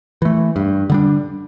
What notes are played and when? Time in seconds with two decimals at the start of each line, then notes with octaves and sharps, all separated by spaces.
0.22 E3 A3
0.56 G2
0.90 D3 G3 D4